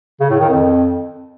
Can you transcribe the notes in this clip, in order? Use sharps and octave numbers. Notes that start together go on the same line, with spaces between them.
C#3
A2
D#3
F2